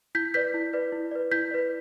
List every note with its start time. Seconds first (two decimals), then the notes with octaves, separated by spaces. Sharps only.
0.15 E4 G6 B6
0.34 B4 D5 G6 B6
0.54 E4
0.73 B4 D5
0.92 E4
1.11 B4 D5
1.31 E4 G6 B6
1.51 B4 D5